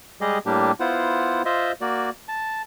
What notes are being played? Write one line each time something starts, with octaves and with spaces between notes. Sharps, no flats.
G3 G#3 G4 G#4 D#5
A2 G3 A#3 D4 G4
B3 E4 F4 C5 F#5
F4 C5 D#5 E5
A#3 F#4 D5
A5